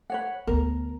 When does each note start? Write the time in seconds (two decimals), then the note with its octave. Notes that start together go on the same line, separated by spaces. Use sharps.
0.10 B4 C#5 F#5
0.47 D2 B3 A#4